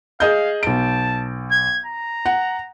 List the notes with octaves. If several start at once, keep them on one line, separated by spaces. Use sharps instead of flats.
G#4 D#5 F5 G6
B1 A5 D7
G#6
A#5
F#5